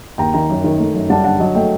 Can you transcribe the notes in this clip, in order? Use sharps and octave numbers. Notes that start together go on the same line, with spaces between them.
D#2 G5 A#5
D#3 G5 A#5
F#2
D#3
A3
F#2
G3 F#5 A5
D3 F#5 A5
F#3 D#5
A3 D#5 G5